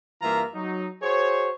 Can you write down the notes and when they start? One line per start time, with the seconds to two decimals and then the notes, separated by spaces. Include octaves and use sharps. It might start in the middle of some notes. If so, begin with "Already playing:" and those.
0.22 G2 E3 A#3 F4 E5 A#5
0.55 F#3 D#4
1.02 F#4 G#4 C5 C#5